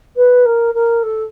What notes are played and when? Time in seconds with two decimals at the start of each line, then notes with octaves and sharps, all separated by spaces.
0.16 B4
0.45 A#4
0.74 A#4
1.03 A4